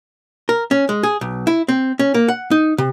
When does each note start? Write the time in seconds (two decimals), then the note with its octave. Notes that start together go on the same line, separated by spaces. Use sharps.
0.49 A#4
0.71 C#4
0.89 G#3
1.03 G#4
1.21 B1
1.47 E4
1.68 C4
1.99 C#4
2.14 A#3
2.28 F#5
2.51 D#4
2.78 C3